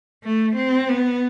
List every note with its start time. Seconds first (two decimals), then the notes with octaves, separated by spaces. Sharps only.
0.24 A3
0.57 C4
0.89 B3